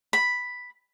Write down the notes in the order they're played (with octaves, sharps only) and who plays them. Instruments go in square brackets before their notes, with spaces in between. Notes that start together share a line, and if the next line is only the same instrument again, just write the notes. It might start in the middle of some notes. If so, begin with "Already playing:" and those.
[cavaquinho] B5